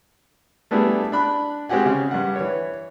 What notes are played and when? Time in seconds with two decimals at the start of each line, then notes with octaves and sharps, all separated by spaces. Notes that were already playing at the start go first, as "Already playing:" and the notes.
0.71 G3 A3 B3 D4 E4 G#4
1.12 D4 B5 F#6
1.69 G#3 C4 F#4 G4 F#5 G#5
1.86 C#3
2.11 G2 G3 F#5
2.36 E3 C#5